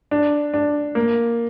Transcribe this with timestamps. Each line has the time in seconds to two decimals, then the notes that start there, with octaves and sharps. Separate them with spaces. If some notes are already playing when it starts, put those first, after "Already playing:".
0.11 D4
0.54 D4
0.95 A#3